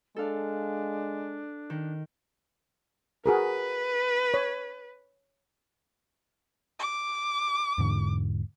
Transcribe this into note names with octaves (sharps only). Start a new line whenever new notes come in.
G#3 D4 A4 F5
D#3
F#4 G#4 A#4 B4
C#5
D6
E2 G#2 D3